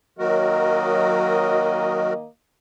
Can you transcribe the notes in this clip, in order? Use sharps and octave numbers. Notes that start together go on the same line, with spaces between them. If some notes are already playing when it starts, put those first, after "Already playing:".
D#3 F#3 A#3 F#4 A#4 D#5